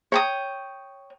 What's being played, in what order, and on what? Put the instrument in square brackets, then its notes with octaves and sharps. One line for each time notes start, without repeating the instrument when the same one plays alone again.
[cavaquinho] C#5 G5 D#6